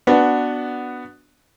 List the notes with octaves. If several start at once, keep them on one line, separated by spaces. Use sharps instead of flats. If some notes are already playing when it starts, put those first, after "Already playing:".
B3 D4 F#4